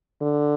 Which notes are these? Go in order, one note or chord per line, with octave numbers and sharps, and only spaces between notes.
D3